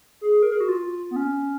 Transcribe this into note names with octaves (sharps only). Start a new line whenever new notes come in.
G#4
A#4
G#4
F#4
F4
B3
C#4